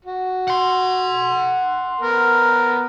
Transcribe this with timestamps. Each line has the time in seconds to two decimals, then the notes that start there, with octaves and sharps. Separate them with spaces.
0.05 F#4
0.48 F#5 C6
2.01 B3 A#4